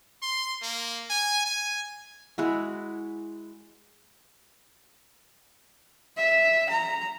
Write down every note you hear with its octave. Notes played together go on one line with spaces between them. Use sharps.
C6
A#3
G#5
G#5
G#3 E4 F#4
E5
A#5